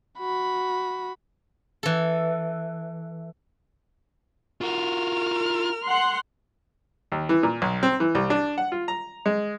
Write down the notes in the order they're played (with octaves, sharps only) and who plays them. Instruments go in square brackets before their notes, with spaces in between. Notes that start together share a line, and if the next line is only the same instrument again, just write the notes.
[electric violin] F#4 B5
[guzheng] E3 A4
[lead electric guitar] F4 F#4 [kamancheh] A#4 F6
[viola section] F#5 C6
[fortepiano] D#2
E3
A#2
B1
C4
E3
C2
D4
F#5
F4
A#5
G#3